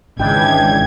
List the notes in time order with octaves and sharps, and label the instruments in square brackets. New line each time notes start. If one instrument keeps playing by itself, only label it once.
[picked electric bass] G#1 [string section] C#2 G#6 [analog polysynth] E3 G#3 D4 [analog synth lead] G5